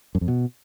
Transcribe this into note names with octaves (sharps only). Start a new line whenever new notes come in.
F#2
F2
B2